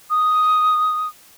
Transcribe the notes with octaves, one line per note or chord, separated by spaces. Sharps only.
D#6